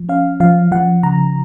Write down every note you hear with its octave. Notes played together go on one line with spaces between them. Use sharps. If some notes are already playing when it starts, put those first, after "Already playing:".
Already playing: F3
C#4 F5
F3 F5
F3 F#5
C#3 A#5